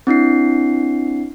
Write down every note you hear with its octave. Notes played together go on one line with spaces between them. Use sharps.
C4 D4 E4 C7